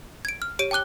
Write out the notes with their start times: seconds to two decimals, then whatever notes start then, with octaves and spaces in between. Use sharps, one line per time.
0.25 G#6 D7
0.42 F6
0.59 G4 C#5 D7 D#7
0.71 G5 A5 D6 F#6 G7